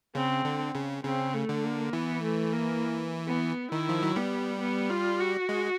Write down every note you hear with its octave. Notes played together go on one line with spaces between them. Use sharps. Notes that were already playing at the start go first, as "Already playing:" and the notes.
C#3 C4
D3
C#3
C#3 C4
A3
D3
A#3
E3 B3
A3
A#3
B3
D#3 E4
F3
F#3
G3 B3
B3
F4
F#4
G#3